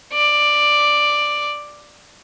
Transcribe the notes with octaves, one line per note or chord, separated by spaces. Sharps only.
D5